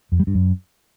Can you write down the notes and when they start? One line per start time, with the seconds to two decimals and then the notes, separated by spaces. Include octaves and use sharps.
0.12 F2
0.19 G3
0.27 G2
0.35 F#2